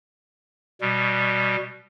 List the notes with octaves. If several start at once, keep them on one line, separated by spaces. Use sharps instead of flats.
B2 G3